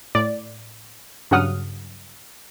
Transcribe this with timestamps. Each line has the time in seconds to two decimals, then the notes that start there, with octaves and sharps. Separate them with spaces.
0.15 A2 D5
1.31 G2 C#3 F#3 F#5 D#6 F6